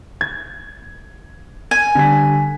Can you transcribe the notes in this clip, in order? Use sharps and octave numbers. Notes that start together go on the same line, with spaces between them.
G#6
G#5
D3 G3 B6